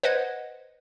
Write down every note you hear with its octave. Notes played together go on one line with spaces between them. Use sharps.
B4 C5 D#5 F#5 G#6